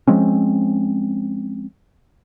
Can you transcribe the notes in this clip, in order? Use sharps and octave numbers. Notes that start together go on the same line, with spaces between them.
F3 G#3 C4 C#4